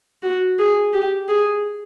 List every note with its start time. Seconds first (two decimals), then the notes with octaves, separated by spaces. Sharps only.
0.23 F#4
0.59 G#4
0.93 G4
1.29 G#4